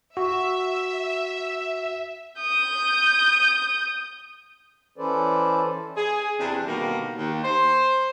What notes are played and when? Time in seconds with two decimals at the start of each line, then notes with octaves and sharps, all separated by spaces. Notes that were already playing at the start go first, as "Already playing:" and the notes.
0.17 F#4 E5
2.42 D#6 G6
4.98 E3 C#4 A4 B4 C5 D5
5.97 G#4
6.39 E2 C3 D4
6.66 B2 D3 D#3 G3 A#3
7.17 D#2
7.43 C5